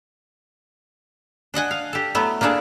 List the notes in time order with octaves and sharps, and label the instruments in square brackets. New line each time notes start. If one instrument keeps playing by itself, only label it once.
[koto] D4 D#5 F#5 G#5
F5
G4 A4
F#3 A3 B3 E4
A#3 B3 D4 G#4 A4